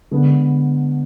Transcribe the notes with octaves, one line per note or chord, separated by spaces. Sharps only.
D3 G#3 B3